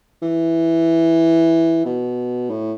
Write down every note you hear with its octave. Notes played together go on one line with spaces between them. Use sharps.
E3
B2
A2